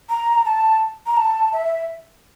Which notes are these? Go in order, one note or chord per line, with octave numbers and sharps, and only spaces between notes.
A#5
A5
A#5
A5
E5